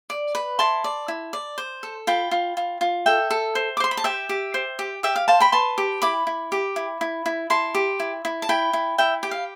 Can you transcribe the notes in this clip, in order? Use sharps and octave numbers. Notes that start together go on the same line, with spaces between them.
D5
B4
E4 A5 C6
D5
E4
D5
C5
A4
F4 G5 B5
F4
F4
F4
A4 E5 G5
A4
C5
D6
C5 C6
B5
A5
G4 E5 G5
G4
C5
G4
G4 E5 G5
F5
C5 F5 A5
G5 B5
B4 A5 C6
G4
E4 B5 D6
E4
G4
E4
E4
E4
E4 A5 C6
G4
E4
E4
A5
E4 G5 B5
E4
E4 E5 G5
G4 G5
F5